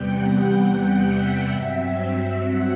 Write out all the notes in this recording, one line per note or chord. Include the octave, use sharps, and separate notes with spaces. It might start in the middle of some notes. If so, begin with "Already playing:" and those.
Already playing: E2 C3 G3 B3 F#5 G5
F#5
F#5
E5
G2 F#3 C4 E5
F#5